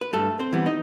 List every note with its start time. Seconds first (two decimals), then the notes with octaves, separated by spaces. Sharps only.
0.01 B4
0.13 G2 A3 A4
0.39 C4 C5
0.53 E3 G3 B3
0.66 D#4 D#5